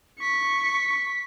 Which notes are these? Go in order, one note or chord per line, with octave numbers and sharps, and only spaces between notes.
C#6 B6